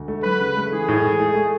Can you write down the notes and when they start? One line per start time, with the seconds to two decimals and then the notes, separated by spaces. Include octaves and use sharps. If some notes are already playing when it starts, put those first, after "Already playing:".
Already playing: D2
0.08 A3
0.24 F#3 B4
0.40 C#3
0.57 A3
0.72 E3 G#4
0.88 A2
1.04 E3
1.19 A3
1.35 A3